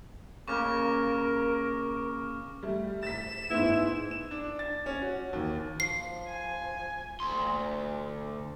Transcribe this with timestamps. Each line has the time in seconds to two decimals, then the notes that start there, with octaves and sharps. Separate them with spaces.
0.48 C#3 A#3 A#4 C#6 D6 F6
2.63 G3 A3
3.03 A6 B6 E7
3.50 G#2 B3 E4
4.11 E7
4.31 D4
4.59 A6
4.86 C#4
5.02 F#4
5.33 D#2
5.80 F3 C7
6.28 G#5
7.20 D2 C6